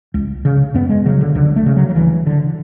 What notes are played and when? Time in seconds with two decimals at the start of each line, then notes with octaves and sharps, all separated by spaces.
0.14 C#2
0.45 C#3
0.74 F#2 B3
0.89 G#3
1.06 C#3 F#3
1.21 D3
1.35 C#2 D3
1.56 A3
1.66 C#3
1.76 F#3
1.89 F#3
1.95 D2 E3
2.27 D3